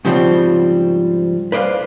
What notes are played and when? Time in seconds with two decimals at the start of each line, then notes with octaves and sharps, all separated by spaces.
0.05 G#2 C#3 F3 G3 C4
1.52 B4 C5 D5 D#5 F5